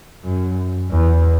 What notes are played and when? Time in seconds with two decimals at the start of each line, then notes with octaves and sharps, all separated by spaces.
0.24 F#2
0.91 E2